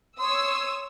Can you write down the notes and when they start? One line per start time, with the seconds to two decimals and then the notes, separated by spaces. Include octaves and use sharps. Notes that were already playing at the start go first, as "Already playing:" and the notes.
0.19 C#5 C6 D#6 E6